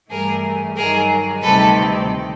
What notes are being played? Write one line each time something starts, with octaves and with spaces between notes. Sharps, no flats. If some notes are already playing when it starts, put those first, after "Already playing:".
G2 E3 A3 G#4 A#4
G2 D#3 F#3 G#4 A#4
D2 C3 D#3 G3 C4 A4 B4